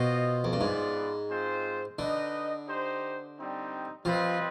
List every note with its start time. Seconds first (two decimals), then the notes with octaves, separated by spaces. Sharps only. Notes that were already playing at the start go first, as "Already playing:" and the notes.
Already playing: B2 F4 C5 D#5
0.44 F2
0.53 G2
0.61 G#2 G#3 B3 F4 B4 D5
1.29 G#3 C4 F4 C5
1.99 D3 D#4 B4 D#5
2.68 D#4 G4 C5
3.37 G3 C4 D#4
4.05 F3 G3 C4 F4 B4 D#5